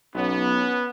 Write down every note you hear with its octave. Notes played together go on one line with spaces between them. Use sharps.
B1 B3 C#4